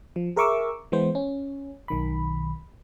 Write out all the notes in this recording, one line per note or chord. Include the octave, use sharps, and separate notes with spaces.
F3
G#4 A#4 E5 C#6 D6 E6
E3 G#3 B3 C5
C#4
B1 D#3 B5